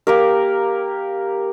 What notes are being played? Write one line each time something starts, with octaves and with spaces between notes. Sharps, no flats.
A#3 G4 A#4